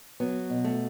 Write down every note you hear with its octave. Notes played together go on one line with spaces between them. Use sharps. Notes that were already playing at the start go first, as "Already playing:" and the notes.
F#3 B3
B2
A3